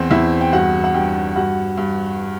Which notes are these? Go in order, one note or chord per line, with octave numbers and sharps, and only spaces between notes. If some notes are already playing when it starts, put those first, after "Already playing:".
Already playing: E2 C4 C5
E2 E4 E5
G5
G2 F#4 F#5
F#5
G2 G4 G5
G2 F#4 F#5
G2